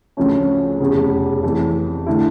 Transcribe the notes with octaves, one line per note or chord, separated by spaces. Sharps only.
D2 C#3 F3 A3 C#4
F1 E2 C#3
F2 E3 A3
D3 A3 E4